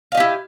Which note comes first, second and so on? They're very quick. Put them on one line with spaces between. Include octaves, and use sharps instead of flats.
F5 D#5 G4 E4